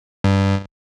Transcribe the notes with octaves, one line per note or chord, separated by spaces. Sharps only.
G2